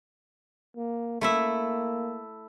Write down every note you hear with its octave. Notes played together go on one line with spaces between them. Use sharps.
A#3
A3 A#3 E4 E5